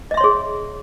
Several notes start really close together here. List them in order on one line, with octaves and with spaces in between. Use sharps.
D#5 E5 C6 C#5 G#4